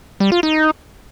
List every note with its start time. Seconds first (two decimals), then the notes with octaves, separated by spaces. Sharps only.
0.20 G3
0.32 F4
0.43 D#4